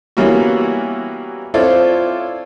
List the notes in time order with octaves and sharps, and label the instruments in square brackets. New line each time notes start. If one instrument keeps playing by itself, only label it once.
[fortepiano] E3 G3 A#3 B3 C#4 F#4
C4 E4 F4 A4 C#5 D5